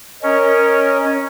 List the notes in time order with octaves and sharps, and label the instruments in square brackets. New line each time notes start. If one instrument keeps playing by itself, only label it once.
[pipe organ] C#4 [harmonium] A#4 C#5 D#5